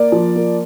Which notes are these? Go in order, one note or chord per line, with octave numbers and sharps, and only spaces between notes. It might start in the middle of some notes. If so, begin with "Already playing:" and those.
Already playing: A#3 D5
F3
A#3